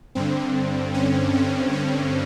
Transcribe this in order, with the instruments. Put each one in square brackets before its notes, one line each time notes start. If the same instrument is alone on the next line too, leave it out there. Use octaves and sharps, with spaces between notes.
[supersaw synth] G2 D3 C4
C#4
C4
C#4